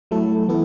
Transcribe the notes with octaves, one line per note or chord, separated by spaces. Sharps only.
F#3 A3 E4 A4
E3 B3 E4 A4